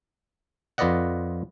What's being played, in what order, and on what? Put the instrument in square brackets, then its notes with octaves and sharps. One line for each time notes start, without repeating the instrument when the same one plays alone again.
[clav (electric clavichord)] F2 F4 B4 D5 D#5 F#5